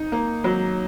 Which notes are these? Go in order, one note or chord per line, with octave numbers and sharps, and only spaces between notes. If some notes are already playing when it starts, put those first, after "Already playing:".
Already playing: D#4
A#3
F#3